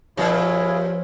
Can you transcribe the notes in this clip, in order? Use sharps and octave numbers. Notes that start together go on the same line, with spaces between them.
G2 A#2 F3 E4 G#4 C#5